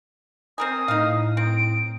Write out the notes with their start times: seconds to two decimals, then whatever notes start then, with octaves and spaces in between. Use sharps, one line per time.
0.58 C4 A#4 G#5 D#6 C7
0.88 A2 D#4 F5
1.37 C4 D7